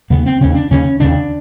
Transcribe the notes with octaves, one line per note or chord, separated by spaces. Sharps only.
D#2 C#3 B3
C4
D#2 C#3 C#4
D4
D#2 C#3 C#4
D#2 C#3 D4